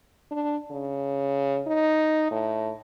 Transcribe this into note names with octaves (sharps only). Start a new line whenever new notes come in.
D4
C#3
D#4
A2